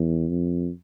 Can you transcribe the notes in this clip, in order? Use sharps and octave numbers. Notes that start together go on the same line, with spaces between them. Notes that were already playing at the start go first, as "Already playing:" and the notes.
Already playing: E2
F2